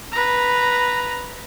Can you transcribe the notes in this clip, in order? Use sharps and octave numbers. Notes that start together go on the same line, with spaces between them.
B4 A#5